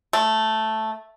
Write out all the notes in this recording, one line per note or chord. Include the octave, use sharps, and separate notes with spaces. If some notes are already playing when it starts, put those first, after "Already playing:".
A3